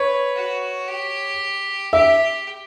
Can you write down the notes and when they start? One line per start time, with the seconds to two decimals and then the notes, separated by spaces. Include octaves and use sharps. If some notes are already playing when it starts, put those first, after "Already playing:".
Already playing: B4 C#5
0.36 F#4
0.88 G4
1.93 G4 E5